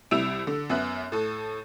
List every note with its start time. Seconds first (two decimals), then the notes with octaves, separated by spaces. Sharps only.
0.11 C2 G3 E4 E6 D7 F7
0.47 D3
0.70 F#2 B3 E5 F#6
1.12 A2 A4